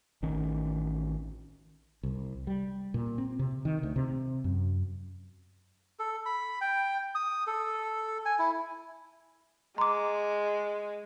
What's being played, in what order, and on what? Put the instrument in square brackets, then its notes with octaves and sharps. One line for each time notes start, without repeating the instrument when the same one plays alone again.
[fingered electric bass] A1 D#3 C#4
[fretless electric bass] C2
G3
A#2
C4
C3
D#3
D2
C3
F#2
[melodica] A4
B5
G5
D#6
A4
G#5
E4
[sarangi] G#3 [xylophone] A#5 D6 [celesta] C6